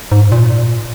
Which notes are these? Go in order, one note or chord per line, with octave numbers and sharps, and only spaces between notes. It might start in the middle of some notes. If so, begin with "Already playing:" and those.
G#2
A#2